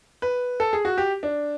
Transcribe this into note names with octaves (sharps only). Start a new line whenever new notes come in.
B4
A4
G#4
F#4
G4
D4